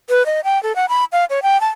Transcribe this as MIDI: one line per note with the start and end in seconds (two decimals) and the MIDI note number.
0.10 0.25 71
0.26 0.40 75
0.44 0.61 79
0.63 0.75 69
0.76 0.86 78
0.89 1.04 83
1.12 1.25 77
1.30 1.40 73
1.43 1.60 79
1.61 1.68 81